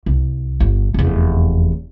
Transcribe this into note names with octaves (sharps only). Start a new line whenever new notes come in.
C2
G1
F1 E2